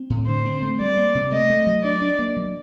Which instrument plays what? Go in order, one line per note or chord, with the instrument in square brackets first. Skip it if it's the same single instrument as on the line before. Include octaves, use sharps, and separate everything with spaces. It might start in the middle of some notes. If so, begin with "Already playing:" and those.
Already playing: [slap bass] C4
A2
[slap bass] D3 [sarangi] C5
[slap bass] C4
A3
[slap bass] G3 [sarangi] D5
[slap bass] A#3
C3
[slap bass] A3 [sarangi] D#5
[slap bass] A3
F#3
[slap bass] D4 [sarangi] D5
[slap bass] D4
A#3
F#3